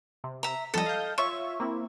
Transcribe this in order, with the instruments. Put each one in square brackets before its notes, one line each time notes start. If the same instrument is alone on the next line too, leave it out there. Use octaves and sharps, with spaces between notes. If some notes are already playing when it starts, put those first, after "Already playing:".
[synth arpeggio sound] C3
[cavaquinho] E5 A#5
[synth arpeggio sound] F2 F3 G3 [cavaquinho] A4 D#5
[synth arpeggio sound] F5 G6
[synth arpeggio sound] F4 C#5 E5 [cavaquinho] C#6
[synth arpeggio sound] A#3 C4 E4